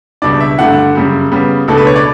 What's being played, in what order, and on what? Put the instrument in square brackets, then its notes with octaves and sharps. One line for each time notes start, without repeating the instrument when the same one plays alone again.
[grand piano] C#2 B2 G3 D4 D5
E5
G2 D3 A3 D4 F#5
F#2 C#3 G3
C#3 G3 B3
C#2 B2 A3 D4 A4
B4
C#5
D5